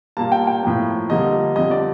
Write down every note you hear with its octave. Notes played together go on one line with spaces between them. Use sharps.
A#2 G3 A#3 A5
G5
G5
A2 F3 A#3
F2 D3 G3 A#3 D#5
F2 D3 G3 D#5
D5